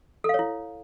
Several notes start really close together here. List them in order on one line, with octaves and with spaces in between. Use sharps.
A4 F5 C#5 E4